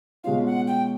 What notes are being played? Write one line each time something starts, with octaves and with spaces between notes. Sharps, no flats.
B2 G#3 C#4 F4 F5
F#5
G5